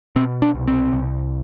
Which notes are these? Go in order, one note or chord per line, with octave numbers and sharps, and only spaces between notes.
B2 C4
D4
C2
C4
C2